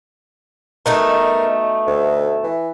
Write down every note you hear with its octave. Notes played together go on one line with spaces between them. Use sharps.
B2 A3 D#4 A#4
D2
E3